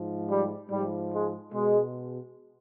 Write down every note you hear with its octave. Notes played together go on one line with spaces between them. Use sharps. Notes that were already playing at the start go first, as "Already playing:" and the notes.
Already playing: G#2 F3
G3
G#2 F3 G3
G#3
B2 G#3